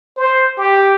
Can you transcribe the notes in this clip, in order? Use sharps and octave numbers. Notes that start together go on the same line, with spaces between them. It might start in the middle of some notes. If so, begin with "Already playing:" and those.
C5
G4